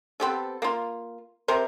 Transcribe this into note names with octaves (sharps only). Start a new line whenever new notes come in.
B3 C4 G4 A4
A#3 F4
C3 A#4 C5